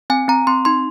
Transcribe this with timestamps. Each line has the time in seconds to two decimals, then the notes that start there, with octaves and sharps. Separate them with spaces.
0.10 C4 G#5
0.28 C4 A#5
0.47 C4 C6
0.65 D#4 C6